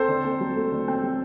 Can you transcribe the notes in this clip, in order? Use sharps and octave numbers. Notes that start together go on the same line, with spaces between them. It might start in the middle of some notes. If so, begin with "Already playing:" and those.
Already playing: C4 A4 C5
D3
C4
F#3
A3
D3
C4
F#3